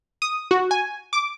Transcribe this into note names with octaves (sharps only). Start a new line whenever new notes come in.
D#6
F#4
G#5
D6